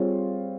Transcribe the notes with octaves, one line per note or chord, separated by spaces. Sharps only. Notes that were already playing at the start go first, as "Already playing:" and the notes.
Already playing: G3 C4 F4 G#4 C#5